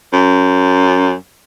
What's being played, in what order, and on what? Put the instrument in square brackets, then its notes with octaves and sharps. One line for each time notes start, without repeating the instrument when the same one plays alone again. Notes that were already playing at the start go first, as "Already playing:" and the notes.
[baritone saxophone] F#2